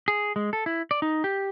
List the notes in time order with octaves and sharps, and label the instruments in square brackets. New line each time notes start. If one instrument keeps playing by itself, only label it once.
[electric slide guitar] G#4
G#3
A4
E4
D5
D#4
G4